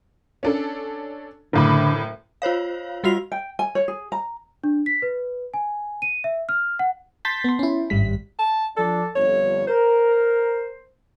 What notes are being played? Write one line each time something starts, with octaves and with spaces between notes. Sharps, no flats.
C#4 D4 A4
F#1 A2 D3 B5
F4 C5 C#5 F5
G3 F4 F#4 C7 F7
G5
G#5
C#5
G#4
A#5
D4
B6
B4
G#5
D#7
E5
F6
F#5
A5 C6 G6 A6 B6
B3 C6
C#4 E4
G#1 G2 G3 B6
A5
F3 D4 A4
G1 F2 C#5
A#4 C5